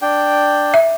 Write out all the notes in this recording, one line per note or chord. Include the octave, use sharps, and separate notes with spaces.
D4 G5
E5